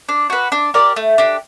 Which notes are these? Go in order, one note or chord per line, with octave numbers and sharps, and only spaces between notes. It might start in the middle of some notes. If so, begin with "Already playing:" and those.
D4
F#4 B4
D4
G4 A#4 D5
A3
D4 G4